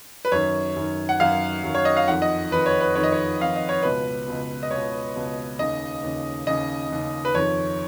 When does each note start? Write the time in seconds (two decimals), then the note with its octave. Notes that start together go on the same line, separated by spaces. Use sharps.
0.25 B4
0.32 F#2 D#3 C#5
0.76 F#2 D#3
1.09 F#5
1.20 F#2 D#3 F5
1.64 F#2 D#3
1.75 C#5
1.85 D#5
1.97 F5
2.07 F2 D#3 F#5
2.22 D#5
2.51 F2 D#3 B4
2.66 C#5
2.81 B4
2.96 F2 D#3 C#5
3.04 D#5
3.12 C#5
3.40 F2 D#3 F5
3.56 D#5
3.69 C#5
3.83 C#2 B2 B4
4.27 C#2 B2
4.63 D#5
4.71 C#2 B2 C#5
5.16 C#2 B2
5.59 D#2 C#3 D#5
6.02 D#2 C#3
6.47 D#2 C#3 D#5
6.90 D#2 C#3
7.25 B4
7.34 F2 D#3 C#5